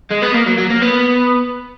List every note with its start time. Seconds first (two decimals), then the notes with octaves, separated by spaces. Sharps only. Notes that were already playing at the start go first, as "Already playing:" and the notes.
0.11 G#3
0.22 B3
0.34 A#3
0.47 F#3
0.58 F#3
0.70 A#3
0.82 B3